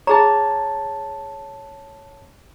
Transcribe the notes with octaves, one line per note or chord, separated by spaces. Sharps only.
G#4 C#5 A5 A#5